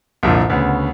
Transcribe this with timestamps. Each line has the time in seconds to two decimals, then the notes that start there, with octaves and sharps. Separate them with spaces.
0.23 C2 F2 A#2 D3
0.50 D2 C#3 B3